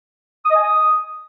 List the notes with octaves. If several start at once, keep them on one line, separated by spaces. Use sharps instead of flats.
D#6
D#5
G#5
D#6